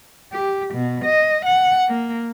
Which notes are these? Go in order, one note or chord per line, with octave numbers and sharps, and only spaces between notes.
G4
B2
D#5
F#5
A#3